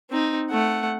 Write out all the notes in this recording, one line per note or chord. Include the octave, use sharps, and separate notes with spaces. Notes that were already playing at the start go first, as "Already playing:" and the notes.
C4 D#4
A3 F#5